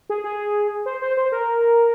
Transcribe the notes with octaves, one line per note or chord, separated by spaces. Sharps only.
G#4
G#4
C5
C5
C5
A#4